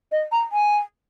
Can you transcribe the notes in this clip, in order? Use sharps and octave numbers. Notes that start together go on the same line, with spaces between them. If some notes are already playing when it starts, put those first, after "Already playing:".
D#5
A#5
G#5